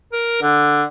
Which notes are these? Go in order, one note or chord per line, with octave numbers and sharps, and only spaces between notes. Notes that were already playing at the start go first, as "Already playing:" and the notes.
A#4
D3